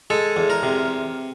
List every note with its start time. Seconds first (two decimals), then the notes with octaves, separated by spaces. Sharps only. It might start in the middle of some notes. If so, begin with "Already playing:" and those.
0.10 G#3 A4
0.37 E2
0.50 A#4
0.63 C3